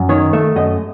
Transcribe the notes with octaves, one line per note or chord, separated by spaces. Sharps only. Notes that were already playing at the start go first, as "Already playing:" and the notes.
Already playing: F#2
D#3 C#5
A3 E5
F#2 D#5